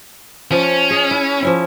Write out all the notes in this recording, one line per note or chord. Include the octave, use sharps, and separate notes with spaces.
F3 C#4
G#4 D#5
E4
F3 C#4 E4